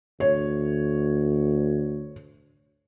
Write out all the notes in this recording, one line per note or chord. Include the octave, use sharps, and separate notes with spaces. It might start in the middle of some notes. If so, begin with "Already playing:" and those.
D2 C#5